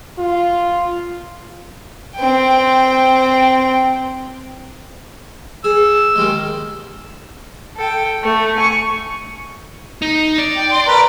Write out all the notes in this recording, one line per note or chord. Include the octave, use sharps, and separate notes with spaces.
F4
C4 G5
G#4 E6
D#3 G3 G#3
A4 G5
A3
G#5 C#6
D#4
D5
G5
C6
A#4 B4